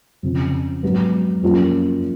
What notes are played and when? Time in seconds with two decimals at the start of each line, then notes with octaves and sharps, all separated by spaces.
0.23 F2 C#3 F3
0.83 G#2 F#3 B3
1.43 F#2 F3 A#3 C#4 F4